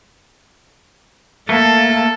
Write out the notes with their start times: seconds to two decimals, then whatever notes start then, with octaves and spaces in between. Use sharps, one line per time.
1.49 A3 A#3 A4